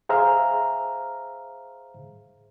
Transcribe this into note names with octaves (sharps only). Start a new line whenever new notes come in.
G#4 C5 E5 F5 A#5 F6